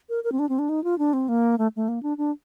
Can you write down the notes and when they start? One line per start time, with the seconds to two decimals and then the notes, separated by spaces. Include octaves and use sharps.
0.09 A#4
0.24 A#4
0.32 C4
0.39 D4
0.49 C4
0.59 D4
0.69 D#4
0.84 F4
0.99 D4
1.13 C4
1.29 A#3
1.58 A3
1.76 A3
1.88 A#3
2.03 D4
2.18 D4